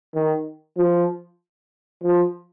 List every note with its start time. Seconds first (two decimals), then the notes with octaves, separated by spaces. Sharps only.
0.15 D#3
0.77 F3
2.03 F3